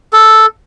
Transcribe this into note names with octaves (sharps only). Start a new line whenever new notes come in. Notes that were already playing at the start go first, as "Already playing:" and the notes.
A4